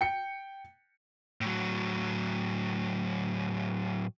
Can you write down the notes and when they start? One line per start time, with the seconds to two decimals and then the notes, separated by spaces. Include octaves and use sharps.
0.01 G5 C#7
1.41 A2 F#3